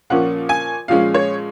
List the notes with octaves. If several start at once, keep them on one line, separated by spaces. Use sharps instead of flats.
A#2 F3 A#3 C#4 F#5
G#5
A#2 F3 G#3 C#4 F5
C#5